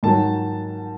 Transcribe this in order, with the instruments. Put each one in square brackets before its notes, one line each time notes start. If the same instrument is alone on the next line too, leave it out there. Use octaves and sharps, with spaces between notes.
[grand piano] G#2 D#3 F#3 A5